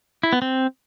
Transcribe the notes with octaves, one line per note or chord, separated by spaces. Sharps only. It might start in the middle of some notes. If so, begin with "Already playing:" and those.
E4
B3
C4